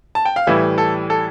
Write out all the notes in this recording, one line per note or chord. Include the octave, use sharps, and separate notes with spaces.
A5
G5
F5
A2 E3 G3 E5
A4
A4